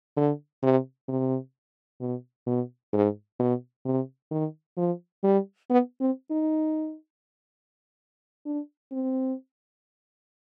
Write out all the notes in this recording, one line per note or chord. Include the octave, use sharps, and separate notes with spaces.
D3
C3
C3
B2
B2
G#2
B2
C3
D#3
F3
G3
B3
C4
D#4
D4
C4